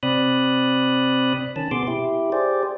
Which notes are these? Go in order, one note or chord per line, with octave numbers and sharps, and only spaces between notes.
C3 C4 D5 B5 D#6 F#6
D#3 C#4 A5
B2 B3 G#4 C6 D6
E4 G4
G4 G#4 C5 D5